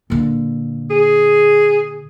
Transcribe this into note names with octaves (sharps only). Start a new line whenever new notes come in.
A#2 D3
G#4